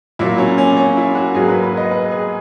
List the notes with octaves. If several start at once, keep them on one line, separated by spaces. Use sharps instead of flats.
A#2 F#3 A#3 E4
C#4
C#4
C#4
E4
F#4
G#2 F#3 A#3 G#4
B4
B4
D#5
B4
G#4